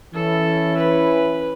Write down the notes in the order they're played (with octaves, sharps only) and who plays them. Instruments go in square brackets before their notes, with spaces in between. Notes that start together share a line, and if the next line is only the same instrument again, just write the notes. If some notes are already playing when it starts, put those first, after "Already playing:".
[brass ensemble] E3 C#4 E4 [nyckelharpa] A4
[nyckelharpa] B4